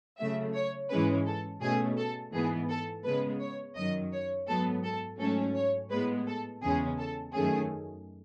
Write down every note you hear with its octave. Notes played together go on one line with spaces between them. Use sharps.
C#3 F#3 A3 E5
C#5
G#2 E3 G#3 C#4 B4
A4
B2 A3 C#4 G#4
A4
G#2 E3 B3 G#4
A4
C#3 G#3 B3 B4
C#5
F#2 D#3 F#3 D#5
C#5
G#2 F#3 B3 A4
A4
G#2 F#3 A3 C#4 A4
C#5
A2 G#3 B3 B4
A4
E2 C#3 G#3 C#4 G#4
A4
F#2 D#3 A3 C#4 G#4